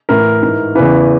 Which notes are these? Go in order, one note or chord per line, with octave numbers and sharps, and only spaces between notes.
A2 E3 A#4
G#2 E3
E2 C#3 E3 B4